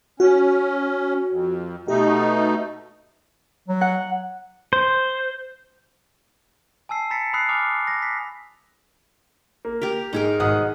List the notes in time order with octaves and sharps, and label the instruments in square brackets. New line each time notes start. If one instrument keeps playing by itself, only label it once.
[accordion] C#4 [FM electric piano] F#4
[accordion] F2
[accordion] B2 A3 D#4 [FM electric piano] G4
[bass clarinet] F#3
[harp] F#5
[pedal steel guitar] C5
[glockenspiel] G#5 A5 E6 C7
A#5 B5 E6 A6 B6 C#7
B5 D#6 E6 F#6 C7
G#5 D6 D#6 F6 F7
A#6
B6
[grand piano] A#3
[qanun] G4 A#4
[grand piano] G#2 [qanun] D#4 G#4 A#4
[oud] G#2 B2 D#3 [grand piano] F#5 D#6